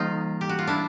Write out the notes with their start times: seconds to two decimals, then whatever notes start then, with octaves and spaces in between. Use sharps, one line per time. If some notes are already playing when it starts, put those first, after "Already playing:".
Already playing: E3 G3 A#3 D#4 F4
0.41 G4
0.49 F#4
0.59 F4
0.67 D4 E4